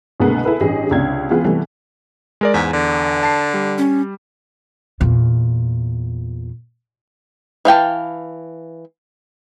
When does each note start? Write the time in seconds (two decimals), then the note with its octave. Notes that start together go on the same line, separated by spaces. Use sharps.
0.20 C2 B2 D3 G#3 A#3 B3
0.45 E4 G#4 A4 B4
0.60 A1 G2 G4 G#4 D#5
0.91 C#2 C3 D4 G#6
1.30 E3 G#3 B3 F4 G#4
1.44 C3 E3 G3 A3 B3
2.41 G#3 A#4 D5
2.54 E2 G#2
2.73 D3
3.23 A5 C7
3.54 G3
3.78 C#4
5.01 E2 A#2
7.65 E3 F5 G5 A5